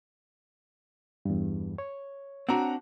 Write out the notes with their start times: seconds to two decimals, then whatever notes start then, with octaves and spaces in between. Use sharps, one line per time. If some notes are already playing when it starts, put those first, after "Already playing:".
1.25 E2 G2
1.78 C#5
2.49 C4 D4 F#4 F#5 A#5